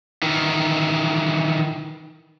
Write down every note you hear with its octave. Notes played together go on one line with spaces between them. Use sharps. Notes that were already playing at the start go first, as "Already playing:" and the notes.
D#3 E3